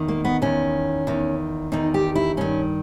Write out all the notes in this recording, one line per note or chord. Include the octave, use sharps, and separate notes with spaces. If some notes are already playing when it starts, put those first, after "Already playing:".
Already playing: E2 D#3
A#3
B3
E2 D#3 C#4
E2 D#3
E2 D#3 D#4
G4
E4
G2 D#3 C#4